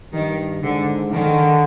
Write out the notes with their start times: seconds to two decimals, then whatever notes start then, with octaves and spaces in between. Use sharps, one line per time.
0.13 G2 D#3
0.63 G#2 D3
1.12 D3 D#3